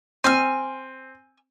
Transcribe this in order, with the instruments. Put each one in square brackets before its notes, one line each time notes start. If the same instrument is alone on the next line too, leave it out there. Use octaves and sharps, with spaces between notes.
[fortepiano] C4 [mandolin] G#5 E6 F6